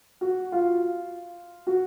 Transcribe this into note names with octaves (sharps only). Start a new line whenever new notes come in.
F#4
F4
F#4